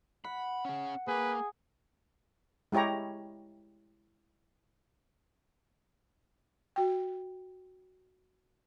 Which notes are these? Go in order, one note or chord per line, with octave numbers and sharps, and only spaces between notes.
F#5 B5
C#4 G#4
A#3 G#4 B4
G#3 E4 G4 C#5 A#5
F#4 G5